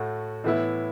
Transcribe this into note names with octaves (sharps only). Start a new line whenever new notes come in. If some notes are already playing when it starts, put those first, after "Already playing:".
Already playing: A2 A3 F#4
A2 E3 B3 E4